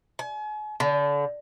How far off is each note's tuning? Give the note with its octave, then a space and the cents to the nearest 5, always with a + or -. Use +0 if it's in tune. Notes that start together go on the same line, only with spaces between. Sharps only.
G#5 +40
D3 -30